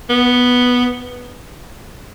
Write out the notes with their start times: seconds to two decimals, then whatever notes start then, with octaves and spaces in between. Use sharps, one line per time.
0.10 B3